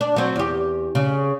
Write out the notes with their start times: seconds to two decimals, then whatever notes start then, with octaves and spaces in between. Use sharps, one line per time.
0.01 D4
0.16 F#3 C4
0.36 E2 G4
0.95 C#3